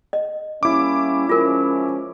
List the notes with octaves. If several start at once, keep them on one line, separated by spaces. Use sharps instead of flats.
D#5
G3 A#3 C#4 E4 D6
F3 G#3 C#4 F4 A#4